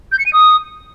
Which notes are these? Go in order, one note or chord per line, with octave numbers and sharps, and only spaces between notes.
G6
C#7
D#7
D#6